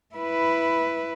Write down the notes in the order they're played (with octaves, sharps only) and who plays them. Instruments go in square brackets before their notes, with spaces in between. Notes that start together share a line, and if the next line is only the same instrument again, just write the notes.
[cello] E4 B4